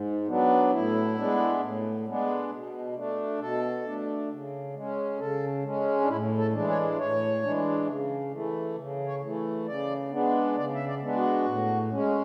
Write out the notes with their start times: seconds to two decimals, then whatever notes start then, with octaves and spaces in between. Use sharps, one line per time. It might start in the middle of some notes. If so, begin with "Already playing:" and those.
Already playing: G#2
0.27 F#3 B3 D4
0.71 A2 E4
1.16 G#3 B3 D4
1.60 A2
2.06 G#3 B3 D4
2.50 B2
2.95 A3 D4
3.39 B2 A4
3.85 A3 D4
4.30 C#3
4.74 G#3
4.79 C#4
5.19 C#3 A4
5.63 G#3 C#4
6.01 D4
6.08 A2 E4
6.38 A4
6.53 E3 G#3 D4
6.68 C#5
6.98 A2 C#5
7.43 E3 G#3 D4
7.87 C#3
8.31 E3 A3
8.76 C#3
9.06 C#5
9.22 E3 A3
9.66 C#3 D5
10.11 G#3 B3 D4
10.56 C#3 D5
10.74 E5
10.86 D5
11.01 G#3 B3 D4
11.16 F#4
11.45 A2
11.90 G#3 C#4